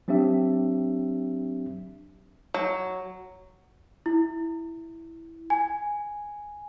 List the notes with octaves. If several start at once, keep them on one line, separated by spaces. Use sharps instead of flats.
F#3 C4 D4 G4 E5
F#3
E4
G#5